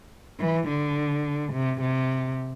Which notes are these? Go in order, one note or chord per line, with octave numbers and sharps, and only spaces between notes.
E3
D3
C3
C3